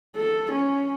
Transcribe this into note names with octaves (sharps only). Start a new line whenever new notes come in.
A4
C#4